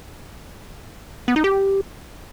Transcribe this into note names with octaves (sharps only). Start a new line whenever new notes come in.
B3
D#4
G4